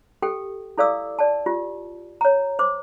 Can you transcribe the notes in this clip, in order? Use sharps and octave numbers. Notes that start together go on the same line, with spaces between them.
G4 A4 G5
E4 A4 D5 F5 D6 E6
D5 A5
F4 G4
C#5 A#5
C5 D6